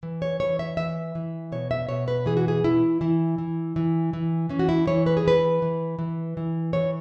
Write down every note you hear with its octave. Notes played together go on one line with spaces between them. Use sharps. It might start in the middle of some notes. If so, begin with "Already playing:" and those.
E3
C#5
E3 C#5
E5
E3 E5
E3
B2 C#5
E5
B2 C#5
B4
E3 G#4
F#4
G#4
E3 E4
E3 E4
E3
E3
E3
E3 C#4
F#4
E4
E3 C#5
B4
G#4
E3 B4
E3
E3
E3
E3 C#5